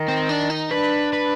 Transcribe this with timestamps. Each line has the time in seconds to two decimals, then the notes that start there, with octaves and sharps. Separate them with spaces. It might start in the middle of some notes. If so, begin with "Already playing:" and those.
Already playing: D#3
0.08 C4
0.29 D4
0.50 D#4
0.71 D4 B4
1.13 B4